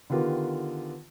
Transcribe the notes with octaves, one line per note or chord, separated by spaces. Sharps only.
D3 D#3 B3 F4 G4 A#4